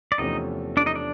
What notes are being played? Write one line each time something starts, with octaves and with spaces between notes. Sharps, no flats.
D5
E2 C3 F3 A3 C#4 D#4 D#5
D4 D5
D#4 D#5
D4 D5